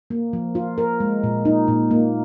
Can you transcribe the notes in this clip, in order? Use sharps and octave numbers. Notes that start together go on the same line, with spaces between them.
A#3
F3
F4
A#4
G#3
A#2
D#4
A#2
A#3